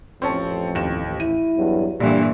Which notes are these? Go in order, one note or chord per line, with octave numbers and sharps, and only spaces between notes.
A1 F2 C4 C#4 A5
D#2 E7
E4 D#7
E2 G2 F#3
A#1 G2 A#2 D3 E3 G3